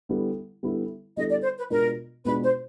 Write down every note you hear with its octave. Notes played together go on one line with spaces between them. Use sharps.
D3 G3 B3 E4 A4
D3 G3 B3 E4 A4
D3 G3 B3 E4 A4 D#5
D5
C5
B4
B2 G#3 B3 D4 F4 A#4
B2 G#3 B3 D4 F4 B4
C5